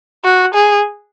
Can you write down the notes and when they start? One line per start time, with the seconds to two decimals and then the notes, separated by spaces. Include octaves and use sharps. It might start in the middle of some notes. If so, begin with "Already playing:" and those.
0.24 F#4
0.54 G#4